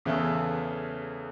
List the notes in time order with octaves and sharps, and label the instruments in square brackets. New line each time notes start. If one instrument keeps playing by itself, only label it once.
[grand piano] E2 C#3 E3 A3